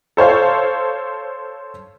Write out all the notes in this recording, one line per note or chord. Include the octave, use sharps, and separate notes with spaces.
A4 C5 C#5 F5